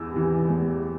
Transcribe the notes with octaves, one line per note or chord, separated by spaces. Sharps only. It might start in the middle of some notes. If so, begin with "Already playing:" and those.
Already playing: E2 E3 E6
C3 E3
E2